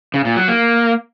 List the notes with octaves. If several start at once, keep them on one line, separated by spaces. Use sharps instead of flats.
C#3
A#2
F#3
A#3